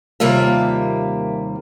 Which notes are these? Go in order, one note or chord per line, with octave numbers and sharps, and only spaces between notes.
D#2 C3 G3 A#3 F4 E5